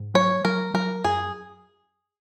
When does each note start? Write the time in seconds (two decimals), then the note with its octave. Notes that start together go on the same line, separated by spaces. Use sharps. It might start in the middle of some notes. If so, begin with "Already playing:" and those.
Already playing: G#2
0.14 F#3 C#5
0.44 F#3 A#4
0.74 F#3 A#4
1.04 F#2 G#4